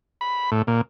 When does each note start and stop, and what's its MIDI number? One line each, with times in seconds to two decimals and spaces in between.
0.21 0.50 83
0.52 0.62 45
0.67 0.81 46